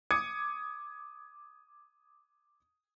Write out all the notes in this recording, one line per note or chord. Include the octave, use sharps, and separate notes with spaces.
D6 D#6 G#6 C#7 D#7